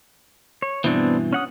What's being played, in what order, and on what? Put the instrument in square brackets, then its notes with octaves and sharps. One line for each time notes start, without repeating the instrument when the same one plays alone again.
[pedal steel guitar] C#5
[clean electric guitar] G2 B2 E3 [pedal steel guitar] B3 C4 D4
[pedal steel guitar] C#4 F#5 D#6